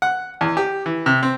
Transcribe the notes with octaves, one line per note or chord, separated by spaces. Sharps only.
F#5
E2
G4
E3
C3
C4